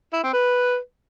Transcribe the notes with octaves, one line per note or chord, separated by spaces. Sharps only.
E4
C4
B4